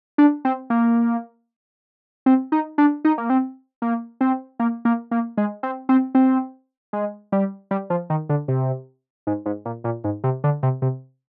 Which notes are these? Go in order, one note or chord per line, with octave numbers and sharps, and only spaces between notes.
D4
C4
A#3
C4
D#4
D4
D#4
A#3
C4
A#3
C4
A#3
A#3
A#3
G#3
C4
C4
C4
G#3
G3
G3
F3
D#3
D3
C3
G#2
G#2
A#2
A#2
G#2
C3
D3
C3
C3